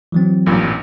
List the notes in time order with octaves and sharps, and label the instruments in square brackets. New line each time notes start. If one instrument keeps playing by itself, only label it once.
[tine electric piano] E3 F#3 C4
[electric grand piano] A1 G2 A#2